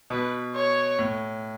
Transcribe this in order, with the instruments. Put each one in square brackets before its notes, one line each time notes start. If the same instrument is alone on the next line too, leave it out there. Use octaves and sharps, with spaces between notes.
[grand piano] B2 [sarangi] B4
[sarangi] C#5
[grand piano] A2